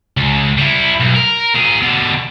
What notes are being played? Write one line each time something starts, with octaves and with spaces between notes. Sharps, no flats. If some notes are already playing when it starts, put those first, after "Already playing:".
C#2
G3 E4
B1
A#4
A#2 G#4
B2 D3